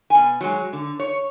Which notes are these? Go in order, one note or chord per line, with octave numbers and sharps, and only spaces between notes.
B2 G#5
F#3 G#3
D3
C#5